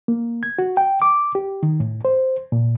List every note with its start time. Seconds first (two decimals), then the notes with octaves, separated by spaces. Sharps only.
0.08 A#3
0.43 G#6
0.59 F#4
0.77 G5
1.02 D6
1.35 G4
1.63 D#3
1.80 A2
2.05 C5
2.52 A#2